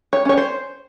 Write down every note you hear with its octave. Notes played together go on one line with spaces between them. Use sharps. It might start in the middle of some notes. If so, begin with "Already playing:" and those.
C#5
C#4 C#5
C5